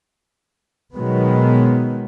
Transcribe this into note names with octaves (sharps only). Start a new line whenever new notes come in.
B2 D#3 F#3 G#3 B3